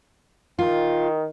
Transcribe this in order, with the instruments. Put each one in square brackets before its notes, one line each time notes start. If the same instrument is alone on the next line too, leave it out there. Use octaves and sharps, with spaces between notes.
[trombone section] D#3 [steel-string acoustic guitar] F4